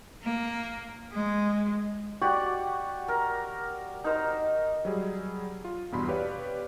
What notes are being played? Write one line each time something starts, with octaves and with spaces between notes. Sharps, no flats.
A#3
G#3
F#4 G4 D5 F#5
A#4
D#4 A#4 C5
F#3 G3 G#4
F4
E2 G2 B2 B5 C6
G4 B4 C#5 D5 F5